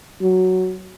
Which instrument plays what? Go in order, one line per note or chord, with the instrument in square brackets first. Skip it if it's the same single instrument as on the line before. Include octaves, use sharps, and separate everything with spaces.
[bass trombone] F#3